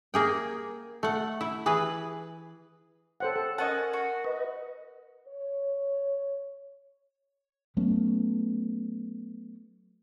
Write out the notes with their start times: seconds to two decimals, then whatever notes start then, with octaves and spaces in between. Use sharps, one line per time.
0.14 A#3 G#4 G5
1.03 A3 F#5
1.41 E4
1.66 E3 G#4 B4
3.20 A4 C5 C#5 F#5 G5
3.36 A4
3.58 C#4 A#4 D#5 F#5 A5
3.93 F#4
4.24 B4 D#5
5.27 C#5
7.77 F#3 A3 B3 C#4